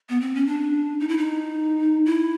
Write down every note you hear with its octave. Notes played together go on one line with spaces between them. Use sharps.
B3
C4
C#4
D4
D#4
E4
D#4
E4